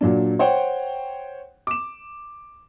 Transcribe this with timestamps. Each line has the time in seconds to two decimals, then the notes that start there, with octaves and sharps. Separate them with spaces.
0.01 A#2 F#3 D4
0.39 C5 C#5 F#5 G5
1.67 D6 E7